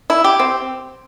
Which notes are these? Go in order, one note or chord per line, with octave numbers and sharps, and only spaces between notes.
E4
G4
C4